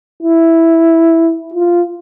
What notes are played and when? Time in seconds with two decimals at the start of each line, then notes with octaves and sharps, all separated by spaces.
0.23 E4
1.53 F4